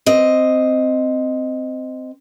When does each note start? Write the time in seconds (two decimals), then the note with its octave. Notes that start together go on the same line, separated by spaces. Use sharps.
0.06 C4 D#5